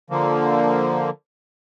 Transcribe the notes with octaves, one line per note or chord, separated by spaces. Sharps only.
D3 F3 A#3